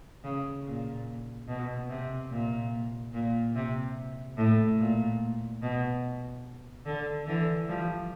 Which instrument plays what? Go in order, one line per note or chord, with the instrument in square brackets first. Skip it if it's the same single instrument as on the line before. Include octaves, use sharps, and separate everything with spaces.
[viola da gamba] C#3
A#2
B2
C3
A#2
A#2
C3
A2
A#2
B2
D3
D3 E3
F3 G3